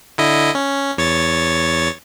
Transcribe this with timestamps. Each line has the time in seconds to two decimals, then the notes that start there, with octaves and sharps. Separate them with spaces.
0.18 D3 E4 D#5
0.55 C#4
0.97 E2 C#5 A6